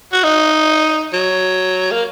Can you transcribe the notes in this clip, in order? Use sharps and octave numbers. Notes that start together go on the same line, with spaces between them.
F#4
D#4
F#3
A#3